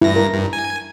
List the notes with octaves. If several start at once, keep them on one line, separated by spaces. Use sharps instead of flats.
G2 E4 A#6
A#4
G2
G#5